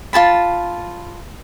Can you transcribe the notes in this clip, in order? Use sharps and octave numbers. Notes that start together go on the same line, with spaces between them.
F4 G#4 A5 B5